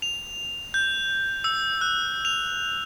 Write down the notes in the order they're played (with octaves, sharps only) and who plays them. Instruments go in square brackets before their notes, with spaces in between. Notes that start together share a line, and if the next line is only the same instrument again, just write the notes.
[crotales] F7
G6
E6
F#6
F7